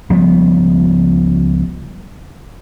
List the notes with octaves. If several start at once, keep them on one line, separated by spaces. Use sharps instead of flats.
C#2 F3 G3 B3